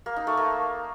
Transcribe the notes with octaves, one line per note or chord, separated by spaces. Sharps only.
A#3
D#4
A3
A#3